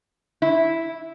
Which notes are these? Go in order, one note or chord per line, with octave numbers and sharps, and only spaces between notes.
E4